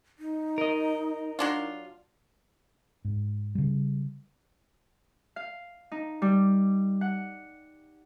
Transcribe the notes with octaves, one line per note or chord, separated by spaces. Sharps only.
D#4
A#4 D#5
F#3 D4 F4
G#2
C#3 G3
F5
D#4
G3
F#5